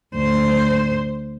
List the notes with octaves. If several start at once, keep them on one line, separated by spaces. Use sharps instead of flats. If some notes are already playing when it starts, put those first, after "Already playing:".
D2 C5